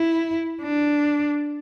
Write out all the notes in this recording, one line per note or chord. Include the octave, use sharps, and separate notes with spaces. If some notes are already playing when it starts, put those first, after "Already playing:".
Already playing: E4
D4